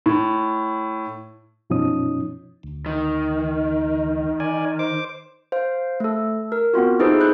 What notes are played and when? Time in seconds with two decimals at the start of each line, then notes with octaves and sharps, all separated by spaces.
0.06 A2
1.70 F#2 B2 F3 C#4 D#4 D#6
2.63 D2
2.86 D#3
4.40 D5 G#5
4.79 C5 D6
5.52 C5 F5
6.00 A3 A4
6.52 A#4
6.74 B3 C4 F4 F#4
7.00 D#4 E4 G#4 A4 B4 C5
7.21 F#6 G6